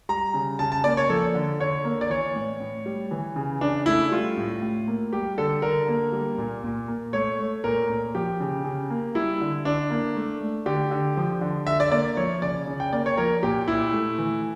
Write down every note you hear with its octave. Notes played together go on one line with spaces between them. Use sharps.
G3 A#5
C#3
C#3 A5
A5
A#3 D5
C#5
F3 A4
D3
D3 C#5
A#3
D5
E3 C#5
A2
A2
G3
E3
C#3
C#3 D4
A3 E4
G3 F4
A2
A2
A#3
G3 G4
D3 A4
D3 A#4
A#3
G3
A#2
A#2
A#3
A3 C#5
A3
A#2 A#4
A#2
F3 G4
C#3
C#3
A#3
G3 E4
D3
D3 D4
A#3
A3
A3
D3 G4
D3
F3
D3
D3 E5
D5
A#3 D5
F3 C#5
C#3 D5
C#3
G5
A#3 D5
C#5
F3 A#4
A#2 G4
A#2 E4
A3
E3